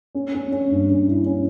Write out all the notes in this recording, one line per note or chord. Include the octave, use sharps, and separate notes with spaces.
C#4
C#4
C#4
G2
C#4
E4
C#4